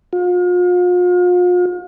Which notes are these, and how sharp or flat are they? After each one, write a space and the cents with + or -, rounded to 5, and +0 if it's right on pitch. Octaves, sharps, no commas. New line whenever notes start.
F4 +40